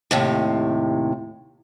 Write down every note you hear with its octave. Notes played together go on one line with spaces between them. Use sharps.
D#2 A2 C3